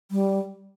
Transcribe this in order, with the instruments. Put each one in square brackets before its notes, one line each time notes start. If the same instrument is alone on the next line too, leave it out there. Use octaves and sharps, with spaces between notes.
[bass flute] G3